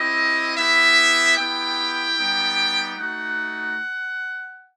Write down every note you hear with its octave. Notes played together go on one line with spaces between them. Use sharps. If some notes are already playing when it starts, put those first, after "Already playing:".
Already playing: C4 E4 G4 D#5
B3 E4 G4 E5
B3 E4 G4 G5
G3 B3 D#4 G4
A3 D#4 F#4 F#5